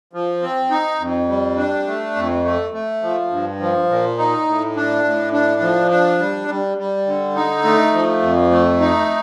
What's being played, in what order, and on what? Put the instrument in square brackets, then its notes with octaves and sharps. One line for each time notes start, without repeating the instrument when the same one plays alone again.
[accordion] F3
C4
D#4
F2
G3
D4
A3
F2
A3
A3
F3
G2
F3
A#2
D#4
A2
D4
A2
D4
F3
D4
G3
G3
G3
D3
D#4
A3
F3
F2
A3
D#4